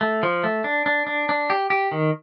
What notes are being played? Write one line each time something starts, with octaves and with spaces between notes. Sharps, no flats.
A3
F3
A3
D4
D4
D4
D4
G4
G4
D#3